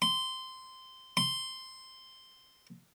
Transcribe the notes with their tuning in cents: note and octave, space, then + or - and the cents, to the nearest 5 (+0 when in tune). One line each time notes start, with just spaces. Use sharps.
C6 -15
C6 -5